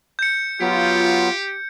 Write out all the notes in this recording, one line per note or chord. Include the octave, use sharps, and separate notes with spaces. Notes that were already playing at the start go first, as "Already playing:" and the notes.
G6 C#7
F#3 B3 F4 G4